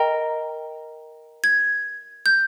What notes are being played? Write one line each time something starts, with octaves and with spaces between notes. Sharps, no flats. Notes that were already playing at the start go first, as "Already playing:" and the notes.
Already playing: A#4 D#5 G5 A#5
G#6
G6